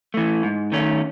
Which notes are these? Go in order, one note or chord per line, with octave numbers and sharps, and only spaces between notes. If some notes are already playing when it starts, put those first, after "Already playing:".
E3 A3
G#2
D#3 A3 C#4